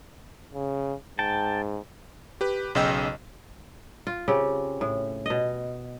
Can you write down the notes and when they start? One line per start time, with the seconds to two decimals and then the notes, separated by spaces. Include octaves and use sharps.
0.55 C#3
1.19 G#2 G5 A5
2.41 G4 B4
2.75 B1 C#3 D#5 G5 E6
4.07 F4
4.28 C#3 C4 G4
4.81 A2
5.26 B2 D#5